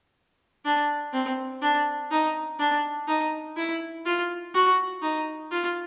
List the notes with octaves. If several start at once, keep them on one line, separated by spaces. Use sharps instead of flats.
D4
C4
D4
D#4
D4
D#4
E4
F4
F#4
D#4
F4